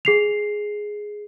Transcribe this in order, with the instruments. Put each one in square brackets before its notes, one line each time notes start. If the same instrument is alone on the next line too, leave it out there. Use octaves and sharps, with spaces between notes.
[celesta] G#4 C7 F7